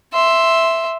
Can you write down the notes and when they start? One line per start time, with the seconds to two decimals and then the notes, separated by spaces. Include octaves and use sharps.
0.14 E5 C6